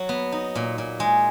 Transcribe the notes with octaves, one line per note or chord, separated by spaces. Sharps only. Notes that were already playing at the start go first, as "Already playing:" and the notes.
Already playing: F#3
B3
D#4
A#2
A#2
G#3